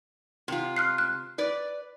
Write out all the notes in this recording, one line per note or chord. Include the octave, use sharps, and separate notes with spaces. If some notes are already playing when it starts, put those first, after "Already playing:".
C3 F4
F6 F#6 C7
F#6
B4 D5